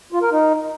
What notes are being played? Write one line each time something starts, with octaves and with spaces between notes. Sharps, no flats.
F4
A#4
D#4